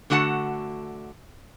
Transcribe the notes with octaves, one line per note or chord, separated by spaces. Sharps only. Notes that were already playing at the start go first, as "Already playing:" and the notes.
D3 A3 F#4 F#5 A5